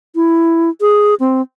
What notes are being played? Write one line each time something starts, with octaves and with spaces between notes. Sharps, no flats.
E4
G#4
C4